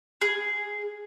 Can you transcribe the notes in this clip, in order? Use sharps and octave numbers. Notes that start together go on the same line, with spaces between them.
G#4